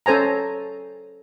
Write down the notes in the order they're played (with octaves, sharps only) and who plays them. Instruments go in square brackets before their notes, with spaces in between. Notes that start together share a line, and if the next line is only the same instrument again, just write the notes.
[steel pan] C#4 A4 C5 G#5 A#5